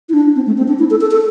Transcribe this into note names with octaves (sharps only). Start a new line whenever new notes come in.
E4
D4
C4
A3
C4
D4
E4
A4
A4
A4